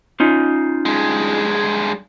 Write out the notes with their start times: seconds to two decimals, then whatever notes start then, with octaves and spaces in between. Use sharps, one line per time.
0.20 C#4 D#4 F4
0.86 G2 G#3